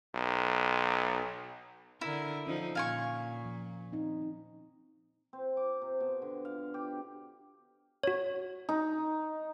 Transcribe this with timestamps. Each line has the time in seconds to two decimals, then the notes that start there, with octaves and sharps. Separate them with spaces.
0.15 B1
2.01 D3 E4 A#4
2.47 D3 F3 C#4 D#4
2.75 A#2 F5 G#5 C#6
3.45 F3
3.92 C4 D#4
5.33 C4
5.57 D6
5.82 C3
6.00 B2
6.22 D3
6.45 F5
6.74 G4
8.03 F#4 C#5
8.69 D#4